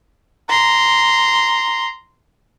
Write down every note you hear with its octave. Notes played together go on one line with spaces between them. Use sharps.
A#5 C6